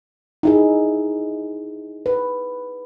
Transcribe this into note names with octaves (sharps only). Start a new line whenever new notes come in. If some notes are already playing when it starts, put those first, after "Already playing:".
D#4 E4 G#4
B4